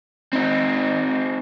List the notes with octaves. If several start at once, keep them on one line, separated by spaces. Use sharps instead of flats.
C4 D#4